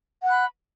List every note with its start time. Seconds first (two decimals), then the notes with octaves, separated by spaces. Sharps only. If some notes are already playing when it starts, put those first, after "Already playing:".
0.23 F#5
0.26 F#6
0.30 B5